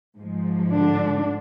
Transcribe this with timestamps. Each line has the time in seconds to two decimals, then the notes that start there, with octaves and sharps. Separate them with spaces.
0.16 G#2 F3 G#3
0.71 D3 D4